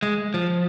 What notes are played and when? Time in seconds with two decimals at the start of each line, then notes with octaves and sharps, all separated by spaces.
0.03 G#3
0.34 F3